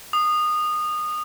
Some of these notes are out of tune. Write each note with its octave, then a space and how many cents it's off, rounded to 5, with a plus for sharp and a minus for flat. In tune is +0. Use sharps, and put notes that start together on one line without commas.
D#6 -20